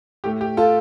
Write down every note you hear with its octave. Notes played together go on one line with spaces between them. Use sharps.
A2 A3 G4
G4
F4 A4